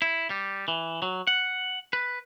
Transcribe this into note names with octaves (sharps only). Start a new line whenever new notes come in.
E4
G3
E3
F#3
F#5
B4